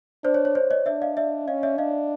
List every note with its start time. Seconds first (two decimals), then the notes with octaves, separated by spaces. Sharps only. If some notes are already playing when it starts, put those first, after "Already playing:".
0.24 D4 C5 D5
0.34 C#5
0.45 C#5
0.55 C5 D5
0.71 C#5 D#5
0.86 D4 D5 E5
1.02 D#5 F5
1.17 D5 E5
1.48 C#4 D#5 F5
1.63 D5 E5
1.78 D4 D#5 F5